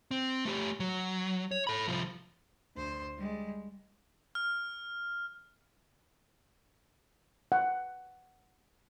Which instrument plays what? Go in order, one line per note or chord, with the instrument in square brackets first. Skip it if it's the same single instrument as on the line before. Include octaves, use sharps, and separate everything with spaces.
[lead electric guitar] C4
A3 G4
F#3
C#5
A4 B5
C2 F3
[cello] D2 C5
G3 G#3
[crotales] F6
[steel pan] F#5